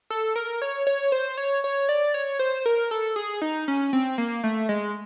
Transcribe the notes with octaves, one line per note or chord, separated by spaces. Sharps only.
A4
A#4
C#5
C#5
C5
C#5
C#5
D5
C#5
C5
A#4
A4
G#4
D#4
C#4
C4
A#3
A3
G#3